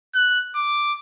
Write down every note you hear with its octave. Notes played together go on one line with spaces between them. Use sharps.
F#6
D6